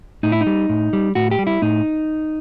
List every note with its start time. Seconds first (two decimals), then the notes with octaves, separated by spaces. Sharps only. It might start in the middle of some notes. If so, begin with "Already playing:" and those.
0.23 A2 D#4
0.32 E4
0.41 D#4
0.47 G3
0.69 A2
0.93 G3
1.15 A2 F#4
1.31 G4
1.39 G3
1.47 E4
1.62 A2 D#4